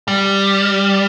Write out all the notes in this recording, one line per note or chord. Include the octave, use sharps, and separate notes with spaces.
G3